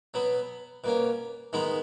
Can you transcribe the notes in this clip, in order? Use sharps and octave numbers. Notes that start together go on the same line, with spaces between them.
B2 F#3 B3
B2 A#3 C#4
D#3 G#3 B3 D#4